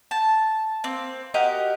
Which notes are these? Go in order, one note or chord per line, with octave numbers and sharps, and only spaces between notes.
A5
A#3 C4
F#4 G4 A#4 D#5